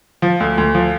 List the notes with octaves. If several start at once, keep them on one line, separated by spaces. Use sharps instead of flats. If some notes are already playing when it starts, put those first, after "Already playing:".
F3
D2
D2
F3